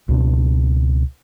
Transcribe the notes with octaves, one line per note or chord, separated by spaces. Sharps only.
C#2 B2 D4